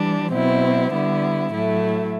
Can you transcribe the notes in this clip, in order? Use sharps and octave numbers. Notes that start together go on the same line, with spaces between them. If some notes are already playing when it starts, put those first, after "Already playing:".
Already playing: E3 G3 D4
B2 F#3 C4 E4
D3 G3 B3 E4
A2 F#3 A3 E4